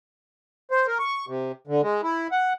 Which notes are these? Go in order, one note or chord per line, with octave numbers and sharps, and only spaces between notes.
C5
A#4
C#6
C3
D3
G#3
E4
F#5